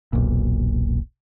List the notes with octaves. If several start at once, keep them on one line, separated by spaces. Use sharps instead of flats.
E1 B1 A#2